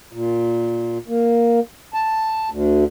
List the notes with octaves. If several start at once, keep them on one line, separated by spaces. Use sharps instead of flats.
A#2
A#3
A5
D2